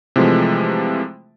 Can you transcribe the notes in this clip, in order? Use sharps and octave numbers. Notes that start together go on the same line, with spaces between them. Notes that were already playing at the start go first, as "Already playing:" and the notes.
C3 E3 F3 G#3 A3